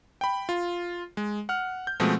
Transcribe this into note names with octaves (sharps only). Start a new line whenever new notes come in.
G5 B5
F4
G#3
F#5 F6
G6
B2 F3 G#3 A3 C4